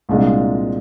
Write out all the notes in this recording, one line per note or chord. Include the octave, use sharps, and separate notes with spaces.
C2 A#2 G#3 D4 F4